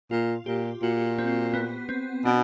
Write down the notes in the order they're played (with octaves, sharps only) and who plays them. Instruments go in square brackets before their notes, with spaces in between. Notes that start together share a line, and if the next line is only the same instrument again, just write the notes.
[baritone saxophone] A#2 [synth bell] F4
[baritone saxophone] A#2 [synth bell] G4
[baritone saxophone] A#2 [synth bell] F#4
[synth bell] C4
B3
C4
[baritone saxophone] B2 [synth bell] D4